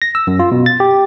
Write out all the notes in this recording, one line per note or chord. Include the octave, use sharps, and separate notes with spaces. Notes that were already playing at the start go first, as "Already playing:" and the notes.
A#6
E6
F#2
F4
B2
A6
G4